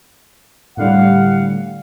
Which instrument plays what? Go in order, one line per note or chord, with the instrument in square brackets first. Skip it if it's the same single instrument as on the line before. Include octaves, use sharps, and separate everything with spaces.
[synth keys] A2 D3 G3 [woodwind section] F5 F#5